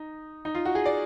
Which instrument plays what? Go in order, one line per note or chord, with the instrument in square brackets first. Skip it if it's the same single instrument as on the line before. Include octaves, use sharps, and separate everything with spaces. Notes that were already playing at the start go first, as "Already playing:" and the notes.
Already playing: [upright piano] D#4
D#4
F4
F#4
G#4
D5